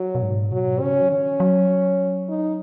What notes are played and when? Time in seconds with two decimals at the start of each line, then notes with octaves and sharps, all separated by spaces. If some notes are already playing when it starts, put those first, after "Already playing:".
Already playing: F#3
0.15 B2
0.22 G#2
0.52 B2 F#3
0.81 C#3 C#4
1.02 F#3
1.10 D#3 C#4
1.40 F#3
2.29 D#4